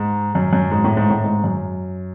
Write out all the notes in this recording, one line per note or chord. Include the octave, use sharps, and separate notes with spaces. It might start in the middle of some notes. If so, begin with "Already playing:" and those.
Already playing: G#2
F#2
F#2
G#2
A2
G#2
A2
G#2
F#2